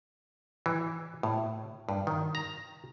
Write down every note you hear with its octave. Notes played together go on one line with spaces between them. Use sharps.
E3
A2
G2
D#3
A#5